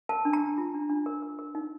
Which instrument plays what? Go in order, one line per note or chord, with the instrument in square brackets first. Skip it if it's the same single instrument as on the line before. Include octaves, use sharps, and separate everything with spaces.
[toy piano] A#4 A5
D4
A#5
D4
F4
D4
D4
A#4
A#4
A#4
D#4